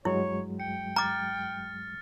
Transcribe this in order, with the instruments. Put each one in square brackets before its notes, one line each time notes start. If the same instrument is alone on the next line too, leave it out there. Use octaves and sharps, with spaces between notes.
[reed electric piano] G2 F#3 G#3 [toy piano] E4 [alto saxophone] C#5
[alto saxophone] G5 [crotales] C#7
[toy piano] A#5 D6 [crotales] F6 A6